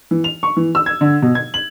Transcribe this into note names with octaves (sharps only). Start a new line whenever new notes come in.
E3
F7
C#6
E3
E6
G#6
D3
B2
G#6
F#7